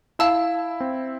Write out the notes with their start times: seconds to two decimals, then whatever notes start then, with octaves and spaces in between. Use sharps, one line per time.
0.19 E4 F5 A5 E6
0.80 C4